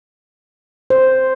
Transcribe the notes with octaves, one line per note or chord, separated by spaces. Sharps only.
C5